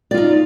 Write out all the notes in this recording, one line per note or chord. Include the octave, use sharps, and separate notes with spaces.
D#4 F4 D5